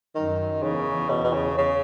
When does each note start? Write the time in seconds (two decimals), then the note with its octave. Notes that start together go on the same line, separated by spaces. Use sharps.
0.15 F#2 D#3
0.62 E2 C#3
1.10 B2
1.24 B2
1.33 C#3
1.58 C#3